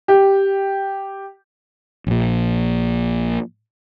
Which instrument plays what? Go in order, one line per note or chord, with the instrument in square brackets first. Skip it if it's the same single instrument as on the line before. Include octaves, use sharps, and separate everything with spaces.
[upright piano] G4
[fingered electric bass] A#1 A#2